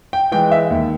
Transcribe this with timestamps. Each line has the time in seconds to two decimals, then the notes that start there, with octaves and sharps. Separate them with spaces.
0.13 G5
0.32 E3 G#3 G5
0.51 E5
0.70 D#2